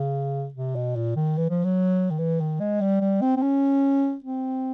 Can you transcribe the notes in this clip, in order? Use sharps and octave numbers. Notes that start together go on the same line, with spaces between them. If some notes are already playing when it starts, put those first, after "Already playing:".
Already playing: C#3
C3
B2
A#2
D#3
E3
F3
F#3
D#3
E3
D#3
G#3
G3
G3
C4
C4
C#4
C4